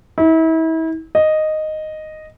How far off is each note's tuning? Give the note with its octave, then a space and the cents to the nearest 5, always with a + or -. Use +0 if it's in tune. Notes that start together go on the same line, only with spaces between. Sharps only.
E4 -35
D#5 -5